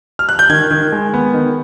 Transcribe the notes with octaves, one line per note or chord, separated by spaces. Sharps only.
F6
F#6
G6
D#3 G#6
D#3
G#3
B3
D#3